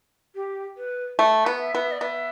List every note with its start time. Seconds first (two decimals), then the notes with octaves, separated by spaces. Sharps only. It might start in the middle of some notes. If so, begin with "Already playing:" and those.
0.35 G4
0.77 B4
1.19 A3
1.46 B3
1.60 E5
1.75 B3
1.92 D5
2.01 B3 E5